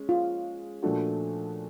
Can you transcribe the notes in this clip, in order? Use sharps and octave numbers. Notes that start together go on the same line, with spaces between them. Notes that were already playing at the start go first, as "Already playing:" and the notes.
Already playing: G#3 C#4
F4
A#2 F3 A3 D4 F#4